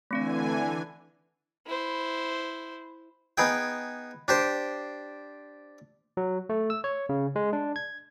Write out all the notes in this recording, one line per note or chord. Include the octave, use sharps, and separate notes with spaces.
D3 E3 A3 C4 D5 G#5
E4 C5
B3 D#4 G#4 G5
D4 G4 C5
F#3
A3
E6
C#5
C#3
G#3
D4
G#6